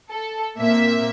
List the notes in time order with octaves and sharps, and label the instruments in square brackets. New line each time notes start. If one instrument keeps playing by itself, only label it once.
[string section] A4
A#2 A#3 C4 E5